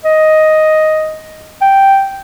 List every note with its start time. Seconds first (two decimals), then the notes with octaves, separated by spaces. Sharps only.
0.04 D#5
1.62 G5